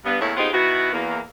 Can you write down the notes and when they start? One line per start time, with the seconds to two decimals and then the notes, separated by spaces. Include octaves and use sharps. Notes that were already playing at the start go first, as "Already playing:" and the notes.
0.05 G2 B3
0.20 E2 A2 A#3 E4 A4 C#5
0.36 B3 C4 D#4 F4 G4 G#4
0.53 B2 D#3 B3 E4 F#4
0.92 E2 A#3